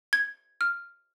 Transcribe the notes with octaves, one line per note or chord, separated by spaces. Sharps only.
G#6
F6